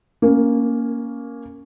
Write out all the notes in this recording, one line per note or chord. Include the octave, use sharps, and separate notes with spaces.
A#3 C#4